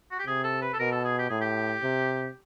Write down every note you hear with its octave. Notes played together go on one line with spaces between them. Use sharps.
F#4
G4
C3 G#4
A4
B4
A4
B2 A#4
A4
G#4
G4
A2 G#4
G4
C3